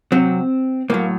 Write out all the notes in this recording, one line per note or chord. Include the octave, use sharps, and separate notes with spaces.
C3 F#3 C4
A2 F#3 A#3